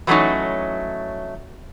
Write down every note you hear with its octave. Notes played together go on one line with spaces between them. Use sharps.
E3 F#3 A3 A#3 C#4 D#4